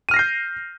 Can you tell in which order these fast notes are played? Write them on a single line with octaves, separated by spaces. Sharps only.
D#7 F6 A#6 C7 G6